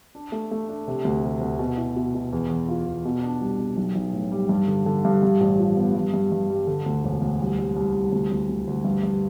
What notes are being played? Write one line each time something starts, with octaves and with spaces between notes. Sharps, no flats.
D4
A3
A3
D4
C3
D2
C3
D2
B2
E4
B2
B2
E2
E2
F4
E2
B2
D4
C2
B2
B1
B1
A2
G3
G2
D3
D3
G2
G2
A1
F3
B3
G2
G2
G2
G3
D3
D2
E1
D2
C2
C2
C2
C2
D2
D2
D2
D2
G2
G2